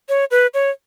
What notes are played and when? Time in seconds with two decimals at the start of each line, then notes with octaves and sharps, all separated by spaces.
0.09 C#5
0.31 B4
0.54 C#5